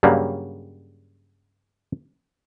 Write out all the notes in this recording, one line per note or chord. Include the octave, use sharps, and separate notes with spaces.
G2 C#3 F#3 G3 A#3